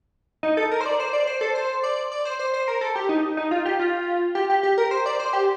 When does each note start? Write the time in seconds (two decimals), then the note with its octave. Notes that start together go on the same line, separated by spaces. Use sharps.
0.43 D#4
0.57 A4
0.71 A#4
0.81 C5
0.86 D5
1.00 C5
1.13 D5
1.27 C5
1.41 A4
1.55 C5
1.83 D5
2.12 D5
2.25 C5
2.39 C5
2.54 C5
2.68 A#4
2.81 A4
2.95 G4
3.09 D#4
3.37 D#4
3.51 F4
3.65 G4
3.79 F4
4.35 G4
4.50 G4
4.63 G4
4.78 A#4
4.91 C5
5.06 D5
5.19 C5
5.33 G4